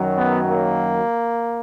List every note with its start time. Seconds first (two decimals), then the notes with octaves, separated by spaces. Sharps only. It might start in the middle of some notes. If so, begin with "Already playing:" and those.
Already playing: F#2 D#3 F#3
0.18 B3
0.48 A#3